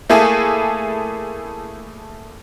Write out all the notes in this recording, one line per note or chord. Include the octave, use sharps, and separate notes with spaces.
A3 A#3 E4 G#4 A4